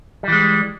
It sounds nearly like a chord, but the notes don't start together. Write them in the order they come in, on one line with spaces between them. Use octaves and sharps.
G3 E3 G#3